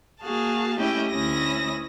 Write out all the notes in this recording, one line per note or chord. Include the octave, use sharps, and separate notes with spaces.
A#3 F#4 G#4 F5 A5
A3 C#4 E4 G4 D#5 G5
D2 C#4 E4 D#6 A#6